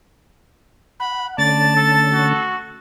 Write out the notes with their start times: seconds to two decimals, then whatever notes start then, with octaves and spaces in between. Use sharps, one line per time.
1.00 F#5 B5
1.38 D3 A3 C#4 D5 A5 A6
1.77 A4
2.13 F#4